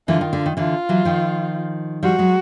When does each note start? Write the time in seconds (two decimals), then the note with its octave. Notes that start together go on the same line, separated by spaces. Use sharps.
0.08 D3 E3 F4
0.21 D#3
0.33 D3
0.46 D#3
0.57 D3 E3 F4
0.89 E3 F#3
1.05 D#3 F3
2.02 F3 G3 F#4
2.18 F#3 G#3